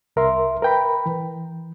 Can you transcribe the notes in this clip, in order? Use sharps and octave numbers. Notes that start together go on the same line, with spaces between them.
C2 A#4 E5 C6
A#4 B4 G5 A#5 B5
E3